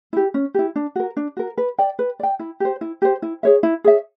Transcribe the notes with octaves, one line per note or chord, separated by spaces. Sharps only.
E4 G4
C#4
E4 G4
D4
F#4 A#4
D4
F#4 A#4
B4
D5 G5
B4
D5 G5
E4
G4 C5
E4
G4 C5
E4
G#4 C#5 E5
E4
G#4 C#5 E5